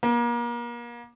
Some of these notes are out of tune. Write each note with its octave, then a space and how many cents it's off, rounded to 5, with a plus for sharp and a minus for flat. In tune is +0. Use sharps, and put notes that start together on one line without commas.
A#3 +35